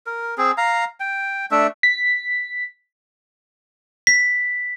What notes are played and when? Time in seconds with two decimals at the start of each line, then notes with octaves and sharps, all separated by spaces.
0.06 A#4
0.38 C4 G#4
0.58 F5 A#5
1.00 G5
1.51 A3 D4 E5
1.83 B6
4.07 B6